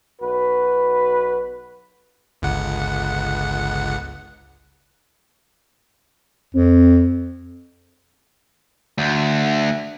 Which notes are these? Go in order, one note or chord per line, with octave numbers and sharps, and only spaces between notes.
B1 F#4 B4
G1 C#2 F#5
F2 C4
D2